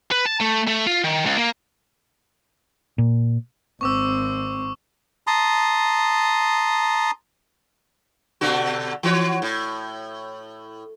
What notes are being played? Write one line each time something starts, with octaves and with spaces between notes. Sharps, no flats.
B4
A5
A3
A3
F4
D#3
C#2
A#3
A#2
G#1 C4 C#6 D6 E6
A5 A#5 C6 D#6
B2 D3 F#4
E3 F#4 C#5
A2